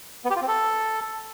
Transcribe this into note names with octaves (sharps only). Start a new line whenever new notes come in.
B3
G4
F4
C4
A4